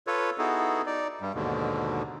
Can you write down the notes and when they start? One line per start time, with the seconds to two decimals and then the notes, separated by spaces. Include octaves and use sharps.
0.07 F4 A4 B4 C#5
0.38 B3 D#4 E4 F#4 G#4 A4
0.86 D#4 D5
1.21 G2 G3
1.35 D#2 G#2 B2 D3